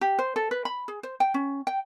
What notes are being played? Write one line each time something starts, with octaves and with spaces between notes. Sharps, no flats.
G4
C5
A4
B4
B5
G#4
C5
G5
C#4
G5